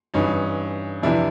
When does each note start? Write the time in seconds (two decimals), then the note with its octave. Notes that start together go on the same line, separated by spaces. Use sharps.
0.14 G2 E3 C#4 D#4
1.02 F2 C3 E3 D4 E4